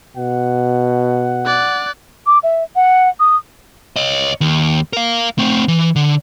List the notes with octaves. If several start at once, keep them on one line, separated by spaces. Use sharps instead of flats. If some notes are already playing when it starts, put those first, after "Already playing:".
B2 F#5
D5 F#6
D6
E5
F#5
D#6
C#5 D#5
D#2
A#4 F5
A3 C4
E3
D3